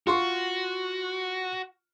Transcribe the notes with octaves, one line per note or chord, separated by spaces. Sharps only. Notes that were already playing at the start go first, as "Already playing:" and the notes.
F4 F#4 C6 C#6